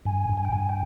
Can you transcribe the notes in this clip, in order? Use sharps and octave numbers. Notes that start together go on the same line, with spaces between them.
G2 G#5
G2
G#5
G5
G2 G#5
G5